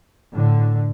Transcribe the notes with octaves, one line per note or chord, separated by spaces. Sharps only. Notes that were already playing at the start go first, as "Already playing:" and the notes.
A2 D3